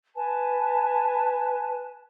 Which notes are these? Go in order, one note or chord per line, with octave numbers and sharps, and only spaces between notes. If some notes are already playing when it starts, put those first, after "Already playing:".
B4 G#5 A5